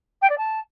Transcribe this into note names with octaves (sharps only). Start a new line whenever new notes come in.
G5
D5
A5